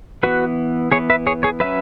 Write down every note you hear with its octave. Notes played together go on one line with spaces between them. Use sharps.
E3 B3 F#4 B4
E3 B3 G#4 C#5
B4 E5
G#4 C#5
G#4 C#5
F#3 C#4 B4 E5